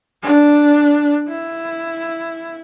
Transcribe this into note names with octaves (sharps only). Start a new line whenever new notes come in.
D4
E4